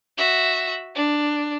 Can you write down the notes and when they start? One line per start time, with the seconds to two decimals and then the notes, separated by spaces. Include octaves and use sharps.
0.17 F#4 E5
0.95 D4